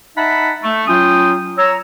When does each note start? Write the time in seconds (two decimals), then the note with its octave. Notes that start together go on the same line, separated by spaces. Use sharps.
0.16 D#4 D#5 E5 F#5 A5 B5
0.63 A3
0.87 F#3 C#4 F4 G5 D#6
1.57 C#5 A#5 E6